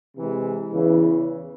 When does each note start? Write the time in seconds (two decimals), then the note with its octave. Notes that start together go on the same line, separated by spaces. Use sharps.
0.16 C3 E3 G#3
0.72 E2 C#3 E3